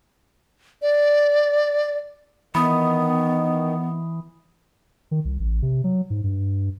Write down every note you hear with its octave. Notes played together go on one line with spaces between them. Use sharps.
D5
D#3 E3 B3 B5 D#6
D#3
C2
A1
C3
F#3
G#2
G2